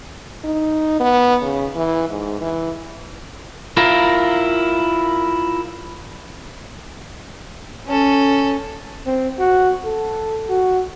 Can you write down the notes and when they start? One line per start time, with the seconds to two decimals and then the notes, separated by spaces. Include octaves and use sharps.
0.44 D#4
1.00 B3
1.42 C#3
1.75 E3
2.09 G#2
2.41 E3
3.77 E4 F4 A#4
7.87 C#4 A4
9.06 C4
9.39 F#4
9.85 A4
10.49 F#4